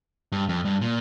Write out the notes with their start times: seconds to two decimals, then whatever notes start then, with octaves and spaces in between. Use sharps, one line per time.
0.32 G2
0.49 F2
0.65 G2
0.81 A#2